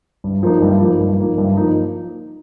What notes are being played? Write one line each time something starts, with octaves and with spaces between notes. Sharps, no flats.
G2
F3 A#3 D#4
G2
F3 A#3 D#4
G2
F3 A#3 D#4
G2
F3 A#3 D#4